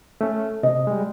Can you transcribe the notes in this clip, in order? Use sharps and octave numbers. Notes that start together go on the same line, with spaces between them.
A3 C#4
C3 D#5
G3 G#3